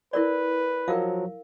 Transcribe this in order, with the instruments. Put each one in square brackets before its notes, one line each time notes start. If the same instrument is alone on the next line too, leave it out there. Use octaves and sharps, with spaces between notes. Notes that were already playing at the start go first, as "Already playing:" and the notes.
[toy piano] E4 A#4 D5 [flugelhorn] B4
[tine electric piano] F3 F#3 [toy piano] A#4 F5